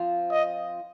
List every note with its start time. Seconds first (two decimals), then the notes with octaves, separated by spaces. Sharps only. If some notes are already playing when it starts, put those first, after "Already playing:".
Already playing: F3 C4 F4
0.31 D#5